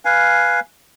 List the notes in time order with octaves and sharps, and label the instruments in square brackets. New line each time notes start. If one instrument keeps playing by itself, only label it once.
[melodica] B4 F5 G#5